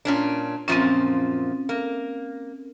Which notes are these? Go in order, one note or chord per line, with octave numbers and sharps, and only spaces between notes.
A#2 C#4 D4
F#2 A#2 F3 C4 C#4
A#3